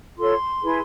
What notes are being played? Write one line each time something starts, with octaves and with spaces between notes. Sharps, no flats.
F4 A4 C#5 C6
E4 G#4 B4